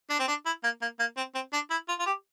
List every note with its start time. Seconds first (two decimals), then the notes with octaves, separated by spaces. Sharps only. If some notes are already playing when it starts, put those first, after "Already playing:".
0.10 D4
0.19 C4
0.28 D4
0.46 E4
0.64 A#3
0.81 A#3
0.99 A#3
1.17 C4
1.34 C4
1.53 D4
1.71 E4
1.88 F4
1.99 F4
2.06 G4